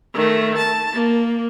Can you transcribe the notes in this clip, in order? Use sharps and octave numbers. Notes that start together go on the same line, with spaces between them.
D#3 A3
A5
A#3